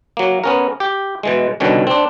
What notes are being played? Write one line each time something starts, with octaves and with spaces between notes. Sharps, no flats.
F#3 A#3
B3 C#4 A#4
G4
B2 E3 G#3
C2 B2 D3 D#3 C#4
C4 D4